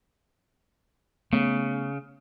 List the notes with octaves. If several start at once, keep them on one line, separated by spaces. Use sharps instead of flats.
C#3 A3 B3